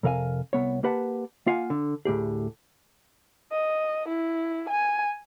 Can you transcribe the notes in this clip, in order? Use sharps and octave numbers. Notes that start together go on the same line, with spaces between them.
F2 C3 A#4 F5 G#5
C2 B3 C#5
A#3 G4 B4 F#5 A5
A#3 F4 F5 F#5 G#5
D3
D2 A2 G4 G#4
D#5
E4
G#5